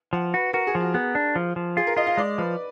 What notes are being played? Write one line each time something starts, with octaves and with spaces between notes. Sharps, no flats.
F3 F#5
F#4 B4
F#4 A#4
G#4
F3
F#4
B3 G#4
D4
F3
F3
F4 G#4
A#4
F4 D#5
F5
G#3 D5
F3 B4